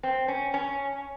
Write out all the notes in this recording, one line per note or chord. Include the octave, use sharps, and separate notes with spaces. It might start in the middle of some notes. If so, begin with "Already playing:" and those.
C4
C#4
C#4